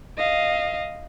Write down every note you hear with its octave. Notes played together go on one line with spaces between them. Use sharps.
D#5 F5